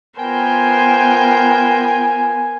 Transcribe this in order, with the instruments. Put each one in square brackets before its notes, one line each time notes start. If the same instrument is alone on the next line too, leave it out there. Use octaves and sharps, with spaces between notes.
[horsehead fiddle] B3 F4 [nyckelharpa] A#4 C5 [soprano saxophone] G5 [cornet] G#5